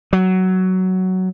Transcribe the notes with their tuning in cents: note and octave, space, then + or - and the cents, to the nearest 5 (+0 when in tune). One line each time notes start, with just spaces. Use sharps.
F#3 +10